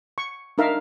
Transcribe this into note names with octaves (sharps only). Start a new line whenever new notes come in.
C#6
D4 D#4 A#4 E5 F5